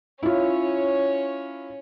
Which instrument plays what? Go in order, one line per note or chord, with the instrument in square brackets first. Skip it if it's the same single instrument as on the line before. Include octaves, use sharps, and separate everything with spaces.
[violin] C#4 C#5 [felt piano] E4 F4